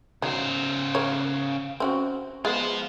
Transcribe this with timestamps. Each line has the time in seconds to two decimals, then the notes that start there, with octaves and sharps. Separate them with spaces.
0.22 C#3 F#3 D#4 C5
0.95 A#4 C#5
1.80 C4 C#4 F#4
2.45 G#3 B3 F4 C5